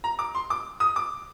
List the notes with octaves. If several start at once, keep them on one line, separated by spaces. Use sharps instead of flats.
A#5
D6
C6
D6
D#6
D6